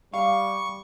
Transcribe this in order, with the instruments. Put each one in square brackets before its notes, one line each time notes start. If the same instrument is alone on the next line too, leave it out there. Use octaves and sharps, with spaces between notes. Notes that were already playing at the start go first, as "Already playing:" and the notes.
[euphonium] G3 [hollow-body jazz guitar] F5 [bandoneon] C#6